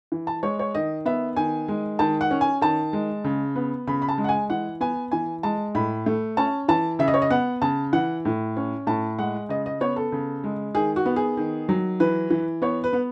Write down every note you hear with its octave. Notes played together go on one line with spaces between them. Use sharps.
E3
A5
G#3 C#5
C#5
D#3 D#5
B3 E5
D#3 G#5
G#3
D#3 A5
F#5
C#4
G#5
D#3 A5
G#3
C#3
B3
C#3 B5
B5
A5
G#3
F#5
G#5
E3 F#5
B3 G#5
E3 G#5
G#3 A5
A2 B5
A3
C#4 A5
E3 A5
C#3 E5
D#5
C#5
D#5
B3 F#5
C#3 A5
E3 F#5
A2
C#4
A2 A5
G#3 F#5
C#3 D#5
D#5
B3 C#5
A4
C#3
G#3
D#3 G#4
F#4
B3
G#4
D#3
F#3
E3 B4
E3
B3 C#5
B4
B3